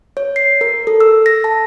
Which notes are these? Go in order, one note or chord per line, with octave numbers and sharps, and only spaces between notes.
C#5
C7
A#4
A4
E6
A#6
A5